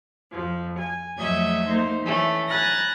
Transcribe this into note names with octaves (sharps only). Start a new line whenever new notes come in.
F2 F3
G#5
F2 F#3 A3 D#5 E5 G#6
A#3 D#4 C5
E3 A3 C#4
G#5 A#5 B5 F#6 A6 A#6